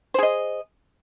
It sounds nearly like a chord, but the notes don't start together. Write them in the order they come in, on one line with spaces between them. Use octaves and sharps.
C5 G#4 D#5